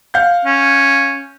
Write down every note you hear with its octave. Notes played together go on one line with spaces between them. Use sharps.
F5 F#5 G6
C#4